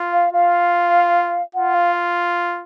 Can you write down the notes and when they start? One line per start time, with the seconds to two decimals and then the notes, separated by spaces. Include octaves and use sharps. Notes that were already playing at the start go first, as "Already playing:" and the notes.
Already playing: F4
0.13 F5
0.33 F4 F5
1.54 F4 F#5
1.74 F5